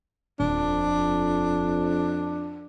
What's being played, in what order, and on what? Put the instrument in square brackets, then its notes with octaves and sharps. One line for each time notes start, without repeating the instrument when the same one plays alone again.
[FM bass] D#1 [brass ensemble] F2 [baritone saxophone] D4